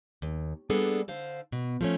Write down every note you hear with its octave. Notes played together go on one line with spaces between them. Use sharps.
D#2
G3 A#3 B3 D4 G#4 A4
D3 C5 F5
B2
F3 A3 C#4